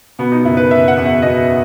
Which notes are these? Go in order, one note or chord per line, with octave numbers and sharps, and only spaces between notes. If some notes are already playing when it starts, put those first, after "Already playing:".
B2 B3
D#4
F#1 E4
B4
F#1 E5
F#5
E2
E5
B2 D#5